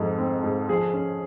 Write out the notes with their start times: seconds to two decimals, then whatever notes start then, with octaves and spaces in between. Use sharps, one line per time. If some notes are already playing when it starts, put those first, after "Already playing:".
Already playing: F2 G#2 F3
0.18 C4
0.44 G#2
0.69 F3 G#4
0.94 C#4